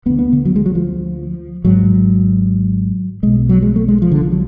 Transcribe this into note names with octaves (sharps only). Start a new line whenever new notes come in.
D2 D3 B3
B3
D3
F#3
G#3
F#3
F3
G#1 G#2 F#3
B1 B2 G#3
F#3
G#3
A3
G#3
F3
D3
F3
F#3